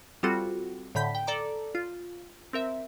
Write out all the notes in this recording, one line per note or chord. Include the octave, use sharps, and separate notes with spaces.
G3 C4 F4 F#4 A4
A2 D3 B5 G6 B6
G5
A4 D5 A#5 D6
F4
C4 A#4 E5